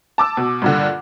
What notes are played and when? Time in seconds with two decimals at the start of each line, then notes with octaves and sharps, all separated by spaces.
0.18 A5 D6 E6
0.37 B2
0.62 G2 A#2 D3